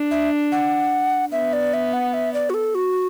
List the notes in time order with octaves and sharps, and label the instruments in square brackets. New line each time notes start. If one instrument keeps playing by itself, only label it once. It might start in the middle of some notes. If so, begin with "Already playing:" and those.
Already playing: [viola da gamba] D4
[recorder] E5
F#5
[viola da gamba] B3 [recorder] E5
[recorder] D5
E5
F#5
E5
D5
F#4
A4
F#4